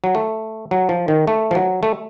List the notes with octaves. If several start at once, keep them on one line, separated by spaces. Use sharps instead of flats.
F#3
A3
F#3
F3
D#3
A3
F3
F#3
A3